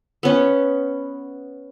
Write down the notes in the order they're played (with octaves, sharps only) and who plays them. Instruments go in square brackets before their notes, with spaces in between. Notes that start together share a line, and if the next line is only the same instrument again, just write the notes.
[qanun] B3 C#4